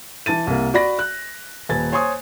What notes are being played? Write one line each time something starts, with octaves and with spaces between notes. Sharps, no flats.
E3 A5 A6 D#7
C2 A#3
F#4 D5 B5 A#6
F#6
D#1 B4 G#5 A6
C5 C#5 G#5 C6 C#6 D#6